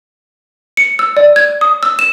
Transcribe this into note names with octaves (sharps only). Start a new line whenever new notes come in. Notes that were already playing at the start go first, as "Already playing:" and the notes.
C#7
E6
D5
G#6
D#6
E6
E7